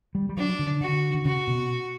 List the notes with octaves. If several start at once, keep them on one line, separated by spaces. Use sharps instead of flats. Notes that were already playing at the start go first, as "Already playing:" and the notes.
G3
G3
F#3 D4
D3
D3 F#4
D3
C#3 F#4
B2